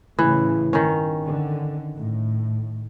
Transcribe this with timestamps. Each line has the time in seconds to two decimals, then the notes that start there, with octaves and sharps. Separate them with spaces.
0.19 A2 C#3 E3
0.73 G1 D#3 C#4
1.23 D3
1.97 A2